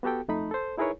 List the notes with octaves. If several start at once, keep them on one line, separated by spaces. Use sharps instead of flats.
B3 F#4 G4 A4 G5
F2 A3 D#4 B5
A4 C5
D#4 E4 G#4 A#4 B4 C#5